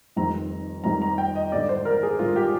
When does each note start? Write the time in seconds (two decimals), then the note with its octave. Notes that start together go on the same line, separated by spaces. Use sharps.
0.16 F1 F2 D#3 G3 C4 A#5
0.84 F1 F2 D#3 G3 C4 A#5
1.02 A#5
1.18 G5
1.35 D#5
1.52 G#1 G2 D3 D5
1.69 C5
1.85 A#4
2.03 G#4
2.19 G#1 G2 D3 F4
2.36 G4